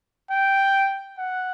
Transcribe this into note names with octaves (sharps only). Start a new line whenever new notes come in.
G5
F#5